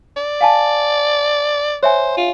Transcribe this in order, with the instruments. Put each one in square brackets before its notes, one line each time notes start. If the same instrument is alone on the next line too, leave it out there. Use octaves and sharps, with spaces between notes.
[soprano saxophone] D5
[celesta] F5 G#5 A5
[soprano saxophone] C5 [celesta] C#5 E5 G#5
[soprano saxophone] F4